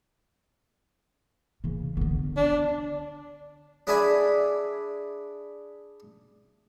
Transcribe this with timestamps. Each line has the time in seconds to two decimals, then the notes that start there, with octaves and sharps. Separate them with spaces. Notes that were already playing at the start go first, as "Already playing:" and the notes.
1.64 C#3 E3
1.97 D3 B3
2.37 D4
3.87 D4 E4 G#4 D5 G#5 B5